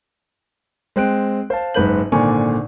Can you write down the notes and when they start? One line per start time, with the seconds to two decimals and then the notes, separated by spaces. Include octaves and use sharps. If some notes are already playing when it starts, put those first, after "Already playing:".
0.96 G#3 C4 F#6 D7
1.50 C5 F5 A5
1.74 F#1 G#2 B4 C5 G6 F#7
2.12 G#1 A#2 D3 G#5 C#6